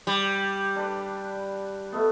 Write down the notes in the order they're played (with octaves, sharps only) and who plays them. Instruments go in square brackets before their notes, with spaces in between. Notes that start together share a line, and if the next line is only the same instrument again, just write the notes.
[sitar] G3
[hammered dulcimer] D4 B4
B2 A3 B3